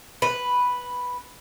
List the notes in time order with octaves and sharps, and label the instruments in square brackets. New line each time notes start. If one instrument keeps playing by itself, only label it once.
[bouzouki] B4